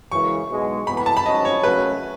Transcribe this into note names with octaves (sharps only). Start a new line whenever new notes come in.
F#2 C#3 E3 G#3 C#6
B1 B2 G#3
A2 E3 B3 B5
B5
A5
B5
G#2 F#3 C#4 D#5
C#5
F#2 C#3 F#3 A3 C#4 B4